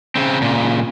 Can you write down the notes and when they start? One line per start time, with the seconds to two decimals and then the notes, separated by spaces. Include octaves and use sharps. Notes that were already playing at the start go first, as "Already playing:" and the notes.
0.15 C#3 C4
0.42 A#2 C#3